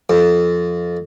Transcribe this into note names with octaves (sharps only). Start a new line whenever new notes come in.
F2